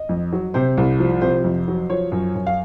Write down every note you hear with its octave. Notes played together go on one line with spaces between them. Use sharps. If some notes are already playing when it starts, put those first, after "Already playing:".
Already playing: D#5
F2
F#3
C3 C5
C2
F3
C3 C5
F2
F#3
F3 C#5
F#2
F#2
F5